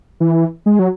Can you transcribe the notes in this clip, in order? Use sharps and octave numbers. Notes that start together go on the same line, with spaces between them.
E3
G#3
F#3